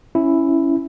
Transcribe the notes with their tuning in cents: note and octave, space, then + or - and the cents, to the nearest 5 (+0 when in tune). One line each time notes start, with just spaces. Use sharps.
C#4 +0 E4 +0